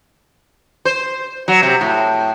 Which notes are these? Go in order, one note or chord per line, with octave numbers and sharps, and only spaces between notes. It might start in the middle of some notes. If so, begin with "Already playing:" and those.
C5
F#3
C3
A2